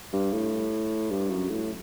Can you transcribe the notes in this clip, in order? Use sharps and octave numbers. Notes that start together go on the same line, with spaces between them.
G2
A2
G2
F#2
A2